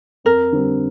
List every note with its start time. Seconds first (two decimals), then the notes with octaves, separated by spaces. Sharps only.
0.25 F2 A#4
0.52 D3 G3 C4